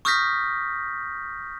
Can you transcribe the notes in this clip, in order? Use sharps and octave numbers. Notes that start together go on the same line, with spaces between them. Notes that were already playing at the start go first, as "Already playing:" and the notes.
C#6 D#6 F6 G6 A#6 B6